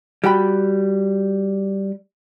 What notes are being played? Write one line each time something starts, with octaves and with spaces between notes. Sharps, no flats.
G3 F#4 G5 B5